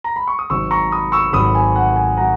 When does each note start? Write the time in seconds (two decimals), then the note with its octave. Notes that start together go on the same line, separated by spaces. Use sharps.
0.04 A#5
0.16 B5
0.28 C#6
0.39 D#6
0.50 G#1 G#2 F#3 C#6 E6
0.71 A#5 C#6
0.91 B5 D#6
1.12 C#6 E6
1.33 G#1 G#2 F#3 B5 D#6
1.55 G#5
1.76 F#5
1.96 G#5
2.17 F#3 F#5 A#5